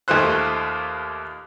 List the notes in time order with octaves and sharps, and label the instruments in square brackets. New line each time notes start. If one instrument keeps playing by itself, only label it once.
[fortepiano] D#2 A3 D#4 F4 C5 F#6